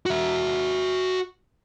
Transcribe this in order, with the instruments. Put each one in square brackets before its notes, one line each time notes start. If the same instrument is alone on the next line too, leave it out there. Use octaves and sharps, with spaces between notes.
[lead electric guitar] F#4 E5